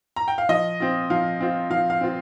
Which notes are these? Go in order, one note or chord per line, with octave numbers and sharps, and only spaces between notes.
A#5
G5
F5
F3 D#5
C4 F4
F3 F5
C4 F4
F3 F5
F5
C4 F4